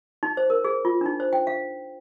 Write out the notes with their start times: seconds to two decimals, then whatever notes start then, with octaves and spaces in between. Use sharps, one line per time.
0.23 D#4
0.37 C5
0.50 A#4
0.64 G#4
0.85 F4
1.01 D4
1.06 D#4
1.20 C5
1.33 G5
1.47 F5